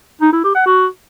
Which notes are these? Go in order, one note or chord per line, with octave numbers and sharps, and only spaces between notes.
D#4
E4
G4
F#5
F#4